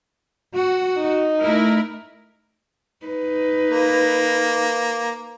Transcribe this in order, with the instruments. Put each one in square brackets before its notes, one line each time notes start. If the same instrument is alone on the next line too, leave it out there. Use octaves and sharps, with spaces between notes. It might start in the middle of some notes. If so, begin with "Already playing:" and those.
[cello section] F#4
[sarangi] D#4
[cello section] A3 E4 A#4
[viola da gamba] D#4 B4
[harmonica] A#3